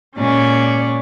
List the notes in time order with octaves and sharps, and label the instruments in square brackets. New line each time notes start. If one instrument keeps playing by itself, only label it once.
[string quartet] A#2 G#3 C#4 C#5 D5